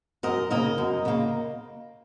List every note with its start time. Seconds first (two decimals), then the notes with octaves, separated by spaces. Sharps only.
0.23 F#2 A#4 D#5
0.50 C#3 A#3 A#4 D#5
0.78 F#2
1.05 C#3 A#3